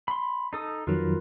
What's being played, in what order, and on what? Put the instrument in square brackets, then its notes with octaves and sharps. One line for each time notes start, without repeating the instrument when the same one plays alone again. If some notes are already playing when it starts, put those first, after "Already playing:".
[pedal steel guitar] B5 C6
D#4 A4 D#6
[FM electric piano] F2 D#3 F#3 [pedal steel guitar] F4 A#4 B4